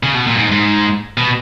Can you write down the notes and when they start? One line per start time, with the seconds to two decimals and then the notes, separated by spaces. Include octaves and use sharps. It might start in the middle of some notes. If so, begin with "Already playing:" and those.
0.03 C#3
0.15 B2
0.27 A#2
0.35 F#2
0.39 G#2
0.51 G#2
1.18 B2